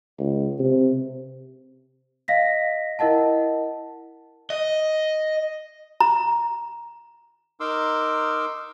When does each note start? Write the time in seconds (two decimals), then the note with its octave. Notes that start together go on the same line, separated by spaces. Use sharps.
0.19 C#2
0.59 C3
2.28 D#5 F5 A#6 B6
2.99 E4 A#4 D#5 F#5 A5
4.50 D#5
6.00 A#5
7.60 D#4 A#4 C6 D6 E6